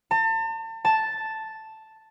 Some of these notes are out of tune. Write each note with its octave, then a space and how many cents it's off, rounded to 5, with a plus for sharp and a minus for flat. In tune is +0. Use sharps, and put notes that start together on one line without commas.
A5 +40
A5 +0